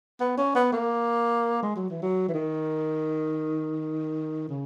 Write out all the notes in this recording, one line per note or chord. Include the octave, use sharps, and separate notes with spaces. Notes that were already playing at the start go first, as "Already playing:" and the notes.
B3
C#4
B3
A#3
G#3
F#3
E3
F#3
E3
D#3
C#3